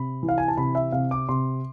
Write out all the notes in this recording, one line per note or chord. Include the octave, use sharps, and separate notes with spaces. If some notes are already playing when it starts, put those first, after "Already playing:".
Already playing: C3 B5
E3
F5
G#5
A5
C3 B5
E5
C3 F5
D6
C3 C6